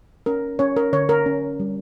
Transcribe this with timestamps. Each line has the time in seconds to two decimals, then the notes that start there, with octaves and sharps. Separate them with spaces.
0.26 C#4 A#4
0.59 C#4 C#5
0.77 A#4
0.93 D3 C#5
1.09 A#4
1.26 C#4
1.60 G3